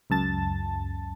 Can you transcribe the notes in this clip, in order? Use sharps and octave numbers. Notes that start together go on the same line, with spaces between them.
C#2 F#2 A5 A6